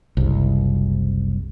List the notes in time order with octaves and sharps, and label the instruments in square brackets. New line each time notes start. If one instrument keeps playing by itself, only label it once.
[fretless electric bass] F#1 C2